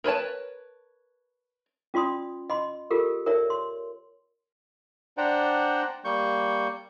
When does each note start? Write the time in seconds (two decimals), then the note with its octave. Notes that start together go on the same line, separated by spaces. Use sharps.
0.04 A#4 B4 C#5 A5
1.94 C#4 F4 D5 C6 D#6
2.50 D#5 B5 C6
2.91 F4 G4 A4 A#4
3.26 A#4 C#5 D5 E5
3.50 C6
5.18 D4 C5 D5 F#5 G5 A#5
6.05 G3 A#3 C#6 G6